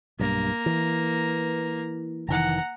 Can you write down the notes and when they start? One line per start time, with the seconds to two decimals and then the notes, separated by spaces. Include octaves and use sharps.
0.19 B1 G2 A#3 A#5
0.66 E3
2.28 F1 D#3 E3 F#5 A#5